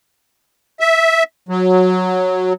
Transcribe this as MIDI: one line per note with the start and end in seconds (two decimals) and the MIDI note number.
0.80 1.23 76
1.49 2.53 54